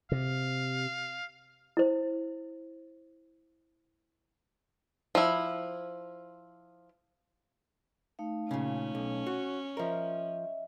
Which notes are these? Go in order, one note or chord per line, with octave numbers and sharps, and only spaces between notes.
C3 F5
E4 C5
F3 E4
A3 D#4 F5
A#2 C#3 C#4
B1
F#4
F3 A#4 D#5 E5